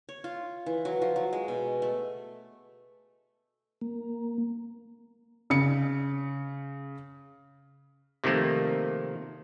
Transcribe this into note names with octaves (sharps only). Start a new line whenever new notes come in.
C#5
F4
E3
F#3
F3
F#3
G#3
B2
A3
A#3
C#3 C#7
C3 D#3 F3 A3 A#3